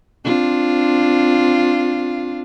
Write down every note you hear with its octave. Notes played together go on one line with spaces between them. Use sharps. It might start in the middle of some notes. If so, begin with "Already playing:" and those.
C4 D4 F4